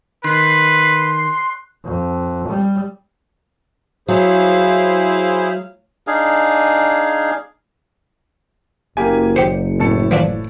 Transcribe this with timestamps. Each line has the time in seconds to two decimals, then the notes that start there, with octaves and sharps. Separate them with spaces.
0.24 D#3 B4 C6 F#6 C7
1.85 F2
2.49 G3
4.08 F#3 E4 G#4 C5 F5
6.07 D4 D#4 G#4 F5
8.97 F#1 A#3 G4 G#5
9.36 G4 C5 C#7
9.80 A2 A5 C#7
10.11 E3 F3 D4